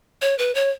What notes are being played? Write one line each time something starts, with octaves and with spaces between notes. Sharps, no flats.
C#5
B4
C#5